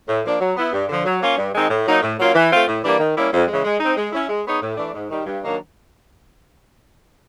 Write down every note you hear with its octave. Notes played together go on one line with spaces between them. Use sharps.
A2
F3 A#3 D4
F#3
B3 E4
G2
D3 F3
F#3
A#3 C#4 F4
G2
D#3 G#3 C4 D#4
A2
F#3 A#3 D#4
A2
F#3 A#3 C#4 F4
E3
A3 C4 F4
A2
E3 G3 A#3 D4
D#3
G3 A#3 C#4 E4
F2
C#3 E3 G#3
G#3
C4 D#4
G#3
C#4 E4
G#3
B3 D#4 G#4 C#5
A2
E3 A3 D4
G#2
D#3 G3
G2
D#3 F#3 A#3 D4